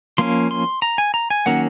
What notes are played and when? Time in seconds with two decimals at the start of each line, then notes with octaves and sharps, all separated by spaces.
0.18 F3 A#3 C#4 C6
0.51 C6
0.82 A#5
0.98 G#5
1.14 A#5
1.30 G#5
1.46 D#3 F#3 A#3 C#4 F#5